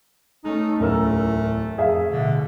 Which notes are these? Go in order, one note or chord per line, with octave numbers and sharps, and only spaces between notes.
A3 C#4 D#4
D1 E2 A3 A#4 E6
F2 G#4 E5 F5
A1 B2 D3